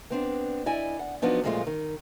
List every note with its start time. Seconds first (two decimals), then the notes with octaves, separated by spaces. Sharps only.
0.10 B3 C4 D4
0.66 E4 D5 D#5 G#5
0.99 F#5
1.22 F3 F#3 B3 D4 D#4
1.43 F#2 A#2 F3 G#3 A3 F4
1.67 D#3